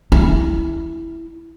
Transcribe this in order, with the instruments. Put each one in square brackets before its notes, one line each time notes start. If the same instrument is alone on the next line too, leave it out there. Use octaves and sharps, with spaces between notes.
[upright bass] E4